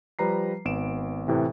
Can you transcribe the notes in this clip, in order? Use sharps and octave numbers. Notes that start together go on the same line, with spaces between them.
F3 G3 B4 A#5 C7
G#1 B3 D7 E7
A2 C3 E3